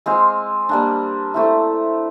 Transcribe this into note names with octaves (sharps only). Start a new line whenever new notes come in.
G#3 C4 F4
G3 A#3 D4
A3 C4 E4